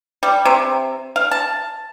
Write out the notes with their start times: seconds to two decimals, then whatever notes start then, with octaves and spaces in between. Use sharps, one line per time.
0.23 G3
0.45 C3
1.16 F5
1.31 A5